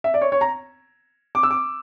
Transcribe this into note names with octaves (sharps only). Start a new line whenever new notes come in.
E5
D5
C#5
C#5
A#5
D6
E6
D6